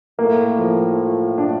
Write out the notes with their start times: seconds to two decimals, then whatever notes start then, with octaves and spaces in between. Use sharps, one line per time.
0.18 A2 A#3
0.58 F3
0.98 F4
1.38 D4